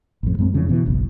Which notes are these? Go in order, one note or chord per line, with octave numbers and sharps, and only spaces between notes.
A1 F2
F#2 G#3 A#3 C4
F2 C#3 E3
B2 E3
F#1 B1